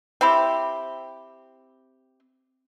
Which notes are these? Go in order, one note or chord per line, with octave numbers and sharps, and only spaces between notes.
C4 E4 G4